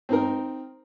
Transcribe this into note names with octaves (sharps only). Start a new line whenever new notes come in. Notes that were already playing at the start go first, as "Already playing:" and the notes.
C4 D#4 A#4